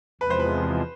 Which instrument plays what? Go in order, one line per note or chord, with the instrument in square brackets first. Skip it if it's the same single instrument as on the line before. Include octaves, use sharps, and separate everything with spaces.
[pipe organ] E2 C3 F3 G#3 [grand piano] B4
[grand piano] C5
B4